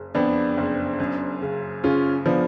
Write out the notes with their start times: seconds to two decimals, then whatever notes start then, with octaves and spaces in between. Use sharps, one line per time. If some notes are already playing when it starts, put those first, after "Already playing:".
Already playing: F#1 C#3
0.15 F2 B3 D4
0.57 F#1
1.00 F#2
1.42 C#3
1.84 C#3 C#4 F4
2.26 F3 B3 D4